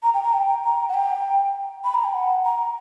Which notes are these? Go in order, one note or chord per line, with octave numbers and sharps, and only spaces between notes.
A#5
G5
A#5
G5
A#5
F#5
G5
B5
A#5
G5
F#5
A#5